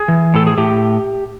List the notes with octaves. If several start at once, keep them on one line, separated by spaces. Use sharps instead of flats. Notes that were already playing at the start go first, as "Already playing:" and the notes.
Already playing: G#4
E3
A2 A4
G#4
A2 G4